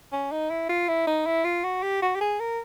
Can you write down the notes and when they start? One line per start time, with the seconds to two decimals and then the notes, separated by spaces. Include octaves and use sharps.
0.12 C#4
0.32 D#4
0.50 E4
0.69 F4
0.89 E4
1.07 D#4
1.26 E4
1.45 F4
1.64 F#4
1.83 G4
2.02 F#4
2.16 G4
2.21 G#4
2.40 A#4